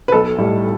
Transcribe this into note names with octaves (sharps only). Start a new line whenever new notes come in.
B4
B1 A4
A2 G3